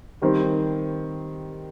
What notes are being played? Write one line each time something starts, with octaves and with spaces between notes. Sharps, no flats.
D#3 G3 C4